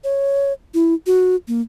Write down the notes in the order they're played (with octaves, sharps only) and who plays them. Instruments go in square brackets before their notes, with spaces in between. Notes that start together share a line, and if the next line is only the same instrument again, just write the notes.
[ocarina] C#5
E4
F#4
A#3